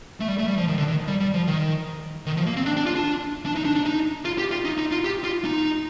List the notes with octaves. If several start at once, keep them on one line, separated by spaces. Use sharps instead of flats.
A3
G3
A3
G3
F3
D#3
D3
D#3
G3
G3
F3
D#3
D#3
F3
A#3
C4
D4
D4
F4
D4
D4
D#4
D4
D4
D#4
F4
G4
F4
D#4
D#4
F4
G4
F4
D#4